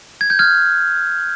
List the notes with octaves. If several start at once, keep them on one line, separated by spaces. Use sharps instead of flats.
G#6
G6
F6 G#6